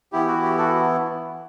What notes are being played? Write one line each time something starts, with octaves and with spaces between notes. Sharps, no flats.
E3 B3 E4 G4
F#4
G4
F#4 A4